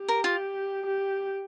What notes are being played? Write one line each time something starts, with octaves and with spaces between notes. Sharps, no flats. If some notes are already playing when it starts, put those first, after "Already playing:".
Already playing: G4
A#4
F4
G4